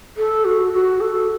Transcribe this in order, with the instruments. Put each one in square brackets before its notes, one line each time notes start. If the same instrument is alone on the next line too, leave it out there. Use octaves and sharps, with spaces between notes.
[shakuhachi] A4
F#4
F#4
A4